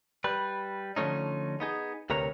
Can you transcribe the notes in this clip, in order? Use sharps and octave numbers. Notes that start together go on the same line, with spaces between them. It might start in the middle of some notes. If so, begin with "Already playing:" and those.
G3 B4
D3 F3 A3 C#4 D#4
B3 D#4 G#4
D2 C3 A#4 B4 C#5 A#5